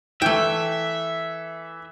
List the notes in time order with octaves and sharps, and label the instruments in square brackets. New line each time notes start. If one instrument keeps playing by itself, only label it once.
[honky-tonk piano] E3 [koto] A3 G5 [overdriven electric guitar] E5